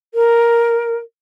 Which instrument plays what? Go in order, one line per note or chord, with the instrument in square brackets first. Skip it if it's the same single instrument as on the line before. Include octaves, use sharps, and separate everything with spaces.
[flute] A#4